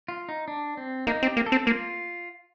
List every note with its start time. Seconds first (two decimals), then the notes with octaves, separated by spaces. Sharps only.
0.08 F4
0.29 D#4
0.48 D4
0.77 C4
1.07 A#3 D#4
1.23 C4
1.26 G4
1.37 A#3
1.46 A4
1.52 C4
1.66 A#3 F4